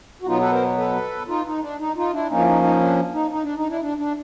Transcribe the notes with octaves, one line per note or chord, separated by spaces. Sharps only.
F#4
B2 F#3 B3 D#4 F4
A4 B4
A#4 C5
A4 B4
D#4 F4
D#4
D4
D#4
D#4 F4
D4 E4
F3 A#3 C#4 D#4
E4
D#4
D#4
D4
D#4
D#4
D4
D#4
D4 E4
D4
D4